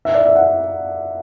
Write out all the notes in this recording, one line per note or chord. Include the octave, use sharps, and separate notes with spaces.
E5
D5
E5
F#5